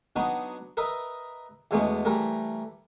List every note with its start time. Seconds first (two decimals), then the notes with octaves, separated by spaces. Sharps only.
0.16 F#3 B3 D4 D#4 F#4
0.77 A#4 B4 D#5 E5
1.71 E2 B2 G#3 A3 B3 C#4
2.05 E3 G3 A3 A#4